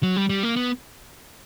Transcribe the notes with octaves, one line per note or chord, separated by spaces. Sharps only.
F#3
G3
G3
A#3
B3